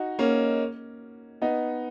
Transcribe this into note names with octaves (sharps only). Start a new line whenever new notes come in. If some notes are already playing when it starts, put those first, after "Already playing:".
Already playing: D#4 F#4
A#3 C#4
B3 D#4